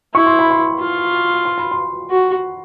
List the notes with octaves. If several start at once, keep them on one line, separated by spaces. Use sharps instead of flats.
E4 C#6
C6
B5
C6
F4
C6
B5
C6
F#4